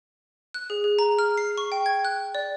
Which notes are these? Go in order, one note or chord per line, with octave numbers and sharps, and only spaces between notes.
F#6
G#4
G#4
A#5
F6
C7
C#6
G5
G#6
F#6
D5